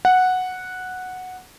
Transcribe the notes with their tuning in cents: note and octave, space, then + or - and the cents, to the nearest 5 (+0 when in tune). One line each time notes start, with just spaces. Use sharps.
F#5 -5